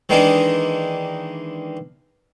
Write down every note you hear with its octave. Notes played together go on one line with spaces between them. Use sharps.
D#3 E3 G#3 A#3 D4 D#4